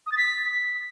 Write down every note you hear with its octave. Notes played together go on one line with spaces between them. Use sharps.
D#6
A6
B6